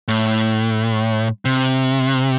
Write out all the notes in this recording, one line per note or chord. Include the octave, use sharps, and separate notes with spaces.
A2
C3